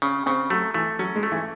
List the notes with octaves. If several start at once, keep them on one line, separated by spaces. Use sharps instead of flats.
C#3 C#4
C#3 C4
F#3 A3
E3 A3
F#3 C#4
G#3
A3
E3